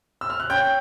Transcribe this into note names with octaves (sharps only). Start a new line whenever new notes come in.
E6
F6
F#6
C#4 G5 G6